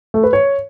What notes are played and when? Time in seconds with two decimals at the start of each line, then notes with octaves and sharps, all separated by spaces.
0.14 A3
0.23 B4
0.33 C#5